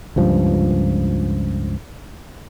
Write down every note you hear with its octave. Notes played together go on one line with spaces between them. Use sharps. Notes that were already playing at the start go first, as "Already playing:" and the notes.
C#2 G2 F3